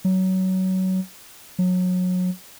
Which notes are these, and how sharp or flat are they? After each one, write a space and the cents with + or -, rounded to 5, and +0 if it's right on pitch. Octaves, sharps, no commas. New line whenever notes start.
F#3 +20
F#3 -25